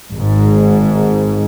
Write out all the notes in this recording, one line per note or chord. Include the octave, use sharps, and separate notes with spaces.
G#1 G#2